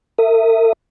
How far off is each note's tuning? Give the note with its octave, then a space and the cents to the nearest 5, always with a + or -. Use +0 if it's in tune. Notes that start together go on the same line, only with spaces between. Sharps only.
A#4 -45 E5 +0 D#6 +0